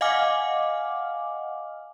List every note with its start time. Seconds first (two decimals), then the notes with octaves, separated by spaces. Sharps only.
0.01 D#5 F5 F#5 G#5 D6 F6